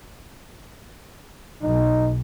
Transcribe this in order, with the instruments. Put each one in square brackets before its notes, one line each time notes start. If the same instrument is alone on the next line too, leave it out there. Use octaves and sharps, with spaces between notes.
[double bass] B1 [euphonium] D#4